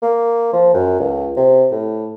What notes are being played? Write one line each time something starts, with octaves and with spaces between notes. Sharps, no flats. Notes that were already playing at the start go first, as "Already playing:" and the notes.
A#3
F3
F#2
C#2
C3
A2